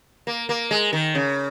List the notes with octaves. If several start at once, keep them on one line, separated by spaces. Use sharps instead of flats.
A#3
A#3
G#3
D#3
C#3